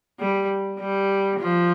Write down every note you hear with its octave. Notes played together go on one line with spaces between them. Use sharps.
G3
G3
F3